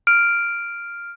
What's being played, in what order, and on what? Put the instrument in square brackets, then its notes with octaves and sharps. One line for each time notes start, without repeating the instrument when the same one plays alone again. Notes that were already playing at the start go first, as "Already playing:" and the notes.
[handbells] F6 D7